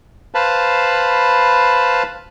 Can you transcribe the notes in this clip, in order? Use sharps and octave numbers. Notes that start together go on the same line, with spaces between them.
B4 C5 F5 A5 B5